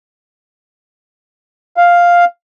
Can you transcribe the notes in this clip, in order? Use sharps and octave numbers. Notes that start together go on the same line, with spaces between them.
F5